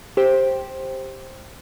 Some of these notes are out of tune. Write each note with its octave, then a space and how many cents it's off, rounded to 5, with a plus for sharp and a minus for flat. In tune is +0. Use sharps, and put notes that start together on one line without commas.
G4 +0 C5 +10